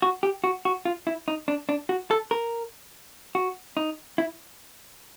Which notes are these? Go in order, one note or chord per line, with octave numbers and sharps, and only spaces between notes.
F#4
G4
F#4
F#4
F4
E4
D#4
D4
D4
F#4
A4
A#4
F#4
D#4
E4